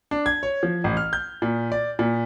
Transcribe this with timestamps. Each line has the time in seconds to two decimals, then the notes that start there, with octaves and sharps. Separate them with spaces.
0.11 D4
0.26 G#6
0.43 C#5
0.63 F3
0.84 A1
0.97 F6
1.13 G6
1.42 A#2
1.72 D5
1.99 A#2